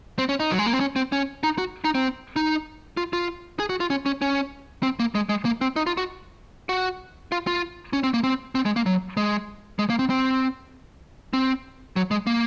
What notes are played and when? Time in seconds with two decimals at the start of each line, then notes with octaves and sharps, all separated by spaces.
0.19 C4
0.29 C#4
0.40 D#4
0.51 F#3
0.59 G#3
0.66 A#3
0.73 C4
0.80 C#4
0.96 C4
1.12 C#4
1.43 D#4
1.58 F#4
1.84 D#4
1.95 C4
2.36 D#4
2.97 F4
3.13 F4
3.60 G#4
3.70 F#4
3.80 F4
3.90 C#4
4.06 C#4
4.22 C#4
4.83 C4
5.00 A#3
5.15 G#3
5.29 G#3
5.45 A#3
5.61 C4
5.76 D#4
5.87 F4
5.97 F#4
6.69 F#4
7.32 F4
7.47 F4
7.93 C#4
8.04 C4
8.14 A#3
8.24 C4
8.55 C4
8.65 G#3
8.76 A#3
8.86 F#3
9.17 G#3
9.79 G#3
9.90 A#3
9.99 C4
10.10 C4
11.33 C4
11.96 F#3
12.11 G#3
12.27 A#3